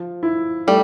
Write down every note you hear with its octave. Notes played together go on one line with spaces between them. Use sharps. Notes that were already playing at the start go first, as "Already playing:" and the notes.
Already playing: F3
E4
G3 A3